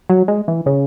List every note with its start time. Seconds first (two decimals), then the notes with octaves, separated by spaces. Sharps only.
0.09 F#3
0.28 G#3
0.48 E3
0.66 C#3